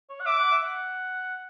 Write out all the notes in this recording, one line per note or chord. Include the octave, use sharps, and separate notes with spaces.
C#5
F#5
E5 D6
F#5
E5
F#5